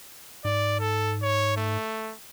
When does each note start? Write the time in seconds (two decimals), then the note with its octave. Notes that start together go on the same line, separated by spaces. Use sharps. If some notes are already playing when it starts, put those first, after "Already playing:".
0.45 G#2 D5
0.80 A4
1.22 C#5
1.56 A3